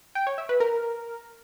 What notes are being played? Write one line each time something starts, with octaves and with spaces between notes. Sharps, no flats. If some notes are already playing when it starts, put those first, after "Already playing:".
G5
C#5
E5
B4
A#4